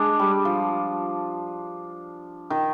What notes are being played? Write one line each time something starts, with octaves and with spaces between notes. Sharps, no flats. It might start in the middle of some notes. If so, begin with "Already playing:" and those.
Already playing: G#3 D4
G3
F3
D#3